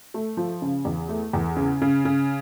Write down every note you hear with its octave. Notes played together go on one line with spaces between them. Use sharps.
A3
F3
C#3
E2
A3
E2
C#3
C#3
C#3